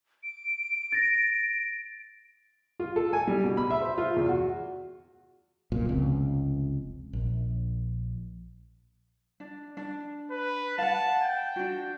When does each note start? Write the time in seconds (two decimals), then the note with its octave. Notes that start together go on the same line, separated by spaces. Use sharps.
0.23 D7
0.92 A6 A#6
2.80 F4
2.96 A4
3.13 G#5
3.27 G3
3.44 B2
3.57 B5
3.70 E5
3.82 C5
3.98 F4
4.16 E2
4.29 F#4
5.72 F1 B1 A#2
5.89 F1 C#2 C4
7.13 A#1
9.40 D4
9.77 D4
10.31 B4
10.78 F5 F#5 A5
11.23 G5
11.56 D4 F#4